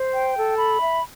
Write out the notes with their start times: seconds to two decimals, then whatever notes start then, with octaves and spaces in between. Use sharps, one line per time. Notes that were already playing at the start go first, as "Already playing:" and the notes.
Already playing: C5
0.13 G5
0.35 A4
0.57 B5
0.79 E5